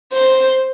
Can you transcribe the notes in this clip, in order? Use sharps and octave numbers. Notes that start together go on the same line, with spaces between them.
C5